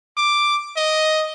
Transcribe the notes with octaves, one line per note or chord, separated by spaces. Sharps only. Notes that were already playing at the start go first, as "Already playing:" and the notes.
D6
D#5